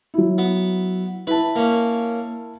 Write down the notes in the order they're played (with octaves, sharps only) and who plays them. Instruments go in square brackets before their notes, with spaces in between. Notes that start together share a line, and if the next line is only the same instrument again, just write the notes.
[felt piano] F#3 E4
[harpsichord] B3
[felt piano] E4 A5 [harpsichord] B4
[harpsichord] A#3 C#4